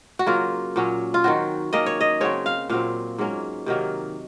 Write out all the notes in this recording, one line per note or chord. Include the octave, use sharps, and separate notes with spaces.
F#4
C#3 F#3 A#3 F4
A#2 F#3 C#4
F4
D#3 F#3 C4 F#4
D#3 A#3 C#4 D#5
C#5
D#5
C#3 F#3 C4 C#5
F5
A#2 F#3 C4 F5
G#2 F#3 A#3 C#4
C3 D#3 F#3 A#3